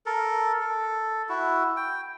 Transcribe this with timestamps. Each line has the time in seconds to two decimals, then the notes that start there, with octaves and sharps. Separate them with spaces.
0.06 A4 A#4
0.61 A4
1.29 E4 F#4
1.77 G5